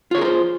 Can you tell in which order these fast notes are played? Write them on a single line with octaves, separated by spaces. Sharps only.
F4 C#5 G#4 A#4 C5